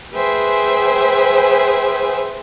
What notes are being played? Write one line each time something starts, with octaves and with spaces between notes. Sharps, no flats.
G#4 B4 C5 E5 G5 G#5